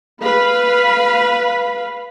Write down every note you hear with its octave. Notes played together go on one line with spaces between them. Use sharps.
B4 F5 B5